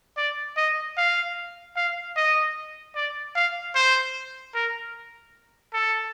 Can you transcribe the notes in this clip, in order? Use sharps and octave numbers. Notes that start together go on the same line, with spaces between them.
D5
D#5
F5
F5
D#5
D5
F5
C5
A#4
A4